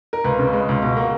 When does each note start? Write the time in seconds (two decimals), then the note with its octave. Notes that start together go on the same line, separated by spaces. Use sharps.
0.13 A#4
0.24 C#2 B4
0.39 C#3
0.53 G#3
0.69 C#2
0.82 B2
0.97 A#3